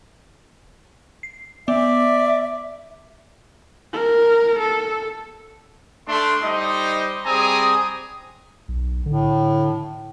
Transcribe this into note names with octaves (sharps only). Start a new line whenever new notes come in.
C7
B3 D5 E5
A#4
A4
A3 D4 C6
G3 D#4 C5 D#5
G3 C4 G#4 G#5 A#5 D#6
B1
A2 D3